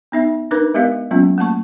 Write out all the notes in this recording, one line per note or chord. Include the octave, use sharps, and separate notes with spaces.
B3 D#4 E5
D4 D#4 A#4 B4 D6
G#3 B3 G4 A#4 D#5 F5
F#3 G#3 A#3 B3 C#4 F4
A3 A#3 A5 C#6